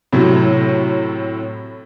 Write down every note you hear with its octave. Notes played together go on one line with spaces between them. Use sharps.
A2 C3 F#3